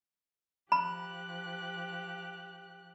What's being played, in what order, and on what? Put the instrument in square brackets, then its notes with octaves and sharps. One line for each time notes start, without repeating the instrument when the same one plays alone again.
[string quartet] F3 G4 F#6 [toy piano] B5